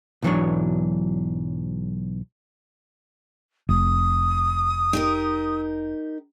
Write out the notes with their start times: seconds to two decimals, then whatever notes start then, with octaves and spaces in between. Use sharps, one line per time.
0.22 B1 G#2 E3 F#3 D4 C#5
3.69 F1 D#6
4.93 D#4 G4 A#4